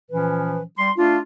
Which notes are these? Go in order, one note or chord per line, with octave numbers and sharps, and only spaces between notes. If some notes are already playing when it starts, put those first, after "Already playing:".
A#2 E3 F3 C#4 B4
G3 C6
A3 D4 F4